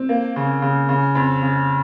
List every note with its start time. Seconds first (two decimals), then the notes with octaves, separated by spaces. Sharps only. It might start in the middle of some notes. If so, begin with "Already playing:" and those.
Already playing: C4
0.09 A#3
0.36 C#3
0.62 C#3
0.89 C#3
1.15 F2
1.42 C#3